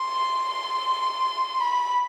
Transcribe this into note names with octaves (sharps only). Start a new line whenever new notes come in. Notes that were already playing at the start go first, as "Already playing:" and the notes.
Already playing: C6
B5